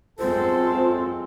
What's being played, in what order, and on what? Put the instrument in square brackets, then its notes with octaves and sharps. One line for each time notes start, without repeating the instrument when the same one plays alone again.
[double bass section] F#2 G#3 C4 [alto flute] F4 [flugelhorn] A4 [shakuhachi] C5